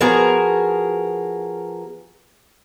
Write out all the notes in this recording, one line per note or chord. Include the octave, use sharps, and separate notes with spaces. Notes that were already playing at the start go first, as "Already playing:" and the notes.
F3 B3 F#4 G#4 A#4